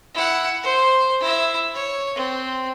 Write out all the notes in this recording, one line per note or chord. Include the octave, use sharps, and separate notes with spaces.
E4 F#5
C5
E4 E5
C#5
C4